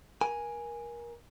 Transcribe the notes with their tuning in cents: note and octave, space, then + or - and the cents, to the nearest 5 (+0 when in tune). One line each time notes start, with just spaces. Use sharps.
A#4 +25 G#5 +0